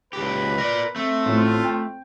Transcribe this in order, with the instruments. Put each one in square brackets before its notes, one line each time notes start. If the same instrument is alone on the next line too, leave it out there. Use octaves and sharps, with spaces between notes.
[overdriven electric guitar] C#2 G4 [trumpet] B4
[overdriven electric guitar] A#4 D5
[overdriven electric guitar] A3 [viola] C4
[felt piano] A1 A2 [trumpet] F4
[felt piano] G5